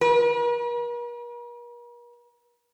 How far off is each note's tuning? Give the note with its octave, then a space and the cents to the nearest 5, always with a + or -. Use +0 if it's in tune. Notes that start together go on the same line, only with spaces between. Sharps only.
A#4 +45